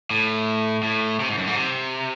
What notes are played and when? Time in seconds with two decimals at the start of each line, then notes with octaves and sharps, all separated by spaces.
0.10 A2
0.83 A2
1.20 C3
1.29 G#2
1.38 F#2
1.47 G#2
1.56 C3